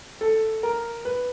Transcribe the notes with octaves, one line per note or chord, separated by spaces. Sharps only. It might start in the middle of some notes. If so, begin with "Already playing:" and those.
A4
A#4
B4